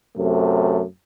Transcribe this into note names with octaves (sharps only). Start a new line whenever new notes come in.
F#2 C3 A3